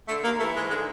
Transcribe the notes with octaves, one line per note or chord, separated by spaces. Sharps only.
D3 A3
D#2 A#3
E3 A3
G#2 G#3
D3 G#3